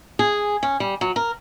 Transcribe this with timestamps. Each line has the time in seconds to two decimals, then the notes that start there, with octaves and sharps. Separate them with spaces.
0.19 G#4
0.63 C#4
0.80 G3
1.01 F#3
1.16 A#4